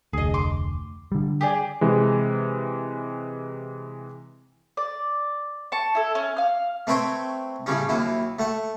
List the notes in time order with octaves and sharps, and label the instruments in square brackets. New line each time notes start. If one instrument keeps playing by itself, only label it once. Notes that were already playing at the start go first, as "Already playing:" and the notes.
[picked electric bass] F1 D2 [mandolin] G#4 D#5
[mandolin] C6 D6
[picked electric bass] D3 G3
[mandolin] G4 G#4 D5
[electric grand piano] C3 E3 G#3
[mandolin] D5
A5 C#6
E4 A4
C#4
F5 F6
[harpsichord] A3 C4 B4 C#5 G5
A2 C#3 G3 C#4
D#2 F#3 E4
A3 F#5